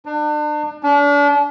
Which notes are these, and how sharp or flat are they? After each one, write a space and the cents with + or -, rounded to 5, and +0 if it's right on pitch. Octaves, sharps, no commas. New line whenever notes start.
D4 +35
D4 -35